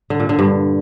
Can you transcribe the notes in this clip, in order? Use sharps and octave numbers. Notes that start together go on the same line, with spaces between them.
D3
A#2
D3
G2